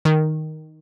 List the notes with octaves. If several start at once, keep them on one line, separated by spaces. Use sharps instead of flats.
D#3